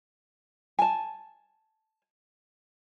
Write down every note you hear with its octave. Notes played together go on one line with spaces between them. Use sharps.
G#5 A5